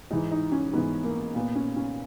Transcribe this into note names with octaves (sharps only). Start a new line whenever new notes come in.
G#2 E3 D#4
D#4
C#4
G#2 E3 B3
A#3
A#2 B3
C#4
C#4